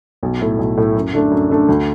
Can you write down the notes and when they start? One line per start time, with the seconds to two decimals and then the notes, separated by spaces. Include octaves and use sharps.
0.23 B1
0.40 A2 A3 E4
0.59 B1
0.77 A2 A3 E4
0.96 F#2
1.14 D3 A3 D4
1.31 F#2
1.50 D3 A3 D4
1.69 D2